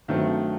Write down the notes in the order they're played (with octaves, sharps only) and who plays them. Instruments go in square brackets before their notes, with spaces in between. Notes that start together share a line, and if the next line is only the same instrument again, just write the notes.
[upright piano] G2 D#3 F#3 A3 C4